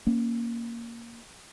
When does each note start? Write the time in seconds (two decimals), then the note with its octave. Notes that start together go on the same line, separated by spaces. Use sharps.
0.07 A#3 C#4